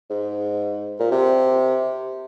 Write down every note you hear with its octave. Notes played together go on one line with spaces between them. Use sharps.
G#2
A#2
C3